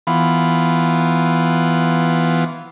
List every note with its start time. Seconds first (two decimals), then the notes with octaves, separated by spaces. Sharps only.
0.07 E3 B3 F4